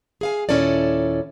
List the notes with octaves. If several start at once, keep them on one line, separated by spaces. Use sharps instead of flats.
G#4 F5 G#5
D#2 A#2 C#4 E4 A4 D5